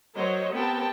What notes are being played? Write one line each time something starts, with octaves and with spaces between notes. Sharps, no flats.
F#3 A#4 C5 C#5 D#5
B3 C4 G4 A#4 G5 A5